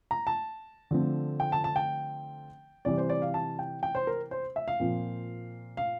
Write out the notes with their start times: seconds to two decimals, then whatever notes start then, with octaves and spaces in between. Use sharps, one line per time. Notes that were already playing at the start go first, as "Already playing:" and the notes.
0.11 A#5
0.27 A5
0.91 D3 F3 A3 C4
1.40 G5
1.52 A5
1.64 A5
1.76 G5
2.85 C3 E3 G3 D5
2.98 C5
3.10 D5
3.22 F5
3.34 A5
3.59 G5
3.83 G5
3.95 C5
4.07 A#4
4.31 C5
4.56 E5
4.68 F5
4.80 A#2 F3 C4
5.77 F5